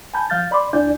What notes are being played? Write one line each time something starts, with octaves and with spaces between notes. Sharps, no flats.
G#5 A5 B5 G6
F3 F5 F6 G6 A6
D5 B5 C6 D6
D2 D4 E4 D5 G#5 G6